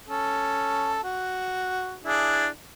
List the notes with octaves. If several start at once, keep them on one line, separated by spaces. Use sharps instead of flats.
C#4 A4
F#4
D4 E4 G#4